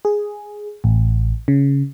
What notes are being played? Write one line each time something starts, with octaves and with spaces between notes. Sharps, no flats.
G#4
A1
C#3